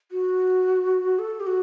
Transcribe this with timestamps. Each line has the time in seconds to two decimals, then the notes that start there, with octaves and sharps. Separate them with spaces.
0.12 F#4
1.19 A4
1.40 G4
1.47 F#4